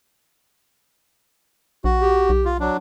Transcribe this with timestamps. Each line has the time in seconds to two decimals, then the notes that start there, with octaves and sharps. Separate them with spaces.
1.84 A#1 F#4
2.02 G4
2.29 B1
2.45 F4
2.60 F#3 D4